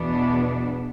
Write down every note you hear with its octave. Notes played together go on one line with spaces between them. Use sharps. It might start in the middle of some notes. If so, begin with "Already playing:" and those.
Already playing: E2 B2 B3 D4